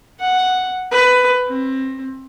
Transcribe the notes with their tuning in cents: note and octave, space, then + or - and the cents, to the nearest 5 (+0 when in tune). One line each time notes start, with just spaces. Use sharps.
F#5 +0
B4 +15
C4 +25